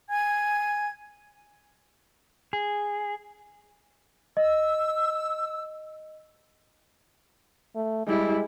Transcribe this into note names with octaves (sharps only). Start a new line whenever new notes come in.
G#5 G#6
G#4
D#5 E6
A3
G3 G#3 E4